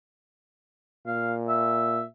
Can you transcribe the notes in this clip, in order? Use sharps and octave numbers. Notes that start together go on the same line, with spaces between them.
A#2 F5
E5